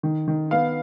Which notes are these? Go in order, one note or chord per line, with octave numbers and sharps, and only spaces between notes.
D#3
D#3
B3 F5